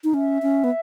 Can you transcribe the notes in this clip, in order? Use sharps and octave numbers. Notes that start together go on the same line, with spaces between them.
D#4
C#4 E5
C#4
B3